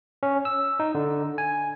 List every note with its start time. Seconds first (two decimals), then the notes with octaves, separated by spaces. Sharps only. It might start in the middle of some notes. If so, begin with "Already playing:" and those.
0.23 C#4
0.45 E6
0.80 D#4
0.95 D3
1.38 G#5